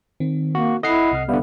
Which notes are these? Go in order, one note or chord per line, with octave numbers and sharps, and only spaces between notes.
D#3 C4
A#3 F#4
E4 A4 D#5 F#5 C7
C2 C3 F6
D3 G3 B3 E5 F5